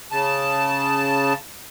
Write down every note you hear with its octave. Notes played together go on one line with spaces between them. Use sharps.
C#3 A5